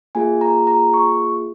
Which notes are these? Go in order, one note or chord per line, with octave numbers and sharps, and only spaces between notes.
A#3 F4 G#4 G#5
A#5
A#5
C#6